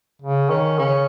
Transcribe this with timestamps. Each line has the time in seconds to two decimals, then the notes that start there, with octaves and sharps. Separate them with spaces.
0.22 C#3
0.50 D#3 C#4
0.79 C#3 C#4